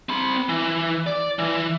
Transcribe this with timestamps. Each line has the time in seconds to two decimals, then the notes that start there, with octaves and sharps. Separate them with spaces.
0.09 C4 B5
0.49 E3
1.07 D5
1.39 E3